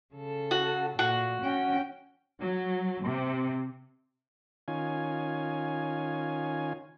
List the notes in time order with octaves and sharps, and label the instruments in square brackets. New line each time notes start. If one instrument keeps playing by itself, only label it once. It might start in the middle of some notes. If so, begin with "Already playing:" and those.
[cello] C#3 A4
[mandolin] F#4
[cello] A#2 [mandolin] F#4
[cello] C#4 G5
[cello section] F#3
C3
[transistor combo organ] D#3 C#4 F4 G#5